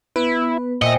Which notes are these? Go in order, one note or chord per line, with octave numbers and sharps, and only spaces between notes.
B3 E4 B4 B5
A#2 C5 D#5 E5 G5 G#5 D#6 C#7